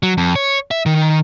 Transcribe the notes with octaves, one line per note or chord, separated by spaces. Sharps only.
F#3
F2
C#5
E5
D#3